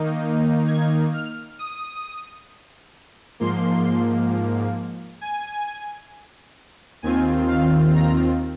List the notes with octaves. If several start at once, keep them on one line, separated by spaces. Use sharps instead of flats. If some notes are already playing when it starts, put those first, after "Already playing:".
Already playing: D#3 A#3 D#4
G#6
F6
D#6
G#2 F3 A#3 C6
G#5
D#2 D#3 C4 F4 G#5
F5
A#5